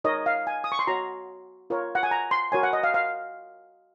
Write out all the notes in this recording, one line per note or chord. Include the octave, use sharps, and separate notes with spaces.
D#4 A#4 C#5 D#5
F5
G#5
D#6
C#6
C6
F#4 C#5 A#5
F4 A#4 C#5
F#5
G#5
A#5
C6
F#4 A#4 C#5 G#5
F#5
D#5
F5
F5